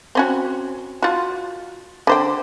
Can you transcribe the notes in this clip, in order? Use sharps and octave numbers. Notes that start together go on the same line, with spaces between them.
C4 C#4 F#4
F4 F#4
D3 C5 G5